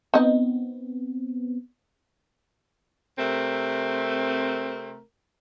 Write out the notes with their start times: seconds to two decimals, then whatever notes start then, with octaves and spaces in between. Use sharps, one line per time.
0.14 B3 C4 D#4 D#5
3.17 C3 A3 C4 A#4